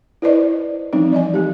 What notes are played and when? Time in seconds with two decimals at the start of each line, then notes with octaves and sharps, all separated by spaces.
0.22 E4 B4 C5 D5 D#5
0.93 E3 F3 G3 C4 D#4
1.13 D5 D#5 G#5
1.34 G3 G4